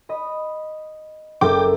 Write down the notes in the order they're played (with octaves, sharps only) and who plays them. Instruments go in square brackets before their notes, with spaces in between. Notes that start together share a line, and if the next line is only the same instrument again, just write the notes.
[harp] D#5 B5
[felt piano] F#1 [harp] A4 A#4 E5 [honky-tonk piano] G5 D6